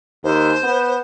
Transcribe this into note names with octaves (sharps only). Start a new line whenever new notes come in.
D#2 C5
B3